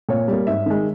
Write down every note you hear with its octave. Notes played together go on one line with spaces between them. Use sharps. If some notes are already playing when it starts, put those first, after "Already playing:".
A#2 C#5
G3 A#3
G#2 E5
D#3 G#3